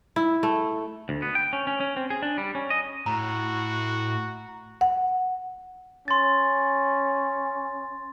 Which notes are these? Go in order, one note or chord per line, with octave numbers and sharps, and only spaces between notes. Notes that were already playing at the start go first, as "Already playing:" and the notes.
E4
A3
D2
B3
G5
C#4
C#4
C#4
C4
G#4
D4
G3
C#4
D#5
A2 F#4 A#5
F#5
C#4 C6 A6